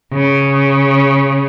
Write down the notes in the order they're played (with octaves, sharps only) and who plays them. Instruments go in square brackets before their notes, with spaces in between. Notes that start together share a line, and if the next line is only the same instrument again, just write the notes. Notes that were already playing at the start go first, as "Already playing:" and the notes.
[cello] C#3